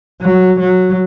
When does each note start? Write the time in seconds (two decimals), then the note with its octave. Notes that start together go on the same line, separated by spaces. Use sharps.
0.21 F#3
0.60 F#3